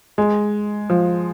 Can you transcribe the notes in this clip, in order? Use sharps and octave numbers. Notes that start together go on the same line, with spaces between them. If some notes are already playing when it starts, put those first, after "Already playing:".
G#3
F3